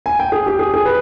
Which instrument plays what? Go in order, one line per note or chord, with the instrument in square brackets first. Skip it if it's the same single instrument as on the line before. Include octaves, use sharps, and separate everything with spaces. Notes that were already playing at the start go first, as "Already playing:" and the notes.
[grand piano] G#5
G5
G#4
G4
G#4
G#4
B4